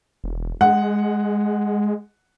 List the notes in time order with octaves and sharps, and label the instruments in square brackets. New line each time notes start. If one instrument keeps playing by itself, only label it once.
[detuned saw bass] E1
[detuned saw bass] G#3 [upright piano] F#5